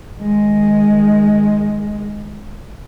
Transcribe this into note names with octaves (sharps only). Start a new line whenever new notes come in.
D#3 G#3